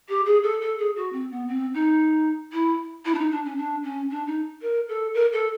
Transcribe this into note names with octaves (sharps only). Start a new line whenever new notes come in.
G4
G#4
A4
A4
G#4
F#4
C4
B3
C4
D#4
E4
E4
D4
D#4
D4
C#4
D4
C#4
D4
D#4
A#4
A4
A#4
A4